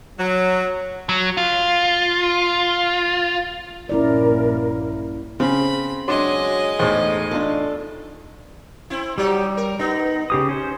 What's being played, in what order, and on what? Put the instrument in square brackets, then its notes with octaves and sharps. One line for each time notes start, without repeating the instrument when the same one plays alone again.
[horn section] F#3
[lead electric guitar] F#3
F4
[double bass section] A#1 G2 A#3 [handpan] C#4 E4 D5 [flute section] A#4
[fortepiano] C#3 [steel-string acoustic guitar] C4 [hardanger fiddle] B5
[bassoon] F#3 [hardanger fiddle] G#3 D#5 [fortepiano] D4 C6
[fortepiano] E2 A2 [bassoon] D#4 [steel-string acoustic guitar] A4 C5
[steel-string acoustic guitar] D4 F4 A4
[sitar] C4 E4
[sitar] F#3 D#4 G4 [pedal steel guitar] G3
[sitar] A#4
[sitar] B3 [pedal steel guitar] D#4
[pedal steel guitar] C#3 G4 D#6
C#4 C5